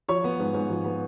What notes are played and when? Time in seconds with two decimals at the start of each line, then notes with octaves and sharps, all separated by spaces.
0.09 F3 C#5 C#6
0.24 B3
0.40 G#2
0.55 G#2
0.70 F3
0.84 B3